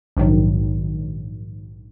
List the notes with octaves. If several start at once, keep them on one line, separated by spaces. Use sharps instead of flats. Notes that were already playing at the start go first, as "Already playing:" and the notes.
A#1 G#2 D#3 F#3